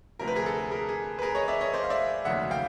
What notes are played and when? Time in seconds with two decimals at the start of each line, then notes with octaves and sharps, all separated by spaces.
0.19 D2 C3 F3 A#4
0.28 B4
0.35 G#4 A#4
0.46 A4
0.71 G#4 A#4
0.89 G#4
1.19 B4
1.22 G#4 A#4
1.35 C#5 D#5
1.48 D5 E5
1.61 C#5 D#5
1.73 C5 D5
1.83 F5
1.90 D5 E5
2.25 F1 D#2 C#3 F#3 E5 F#5
2.51 F5 G5